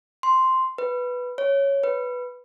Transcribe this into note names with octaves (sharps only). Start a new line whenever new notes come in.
C6
B4
C#5
B4